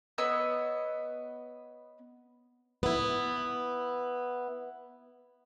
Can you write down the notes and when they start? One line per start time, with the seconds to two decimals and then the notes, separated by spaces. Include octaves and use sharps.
0.18 B3 C#5 D#5 E6
2.83 B3 E4